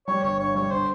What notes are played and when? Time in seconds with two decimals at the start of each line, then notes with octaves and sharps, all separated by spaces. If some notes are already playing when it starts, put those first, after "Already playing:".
0.07 G3 C#5
0.23 G1 C#5
0.40 G2 C#5
0.55 G3 C#5
0.71 D3 C5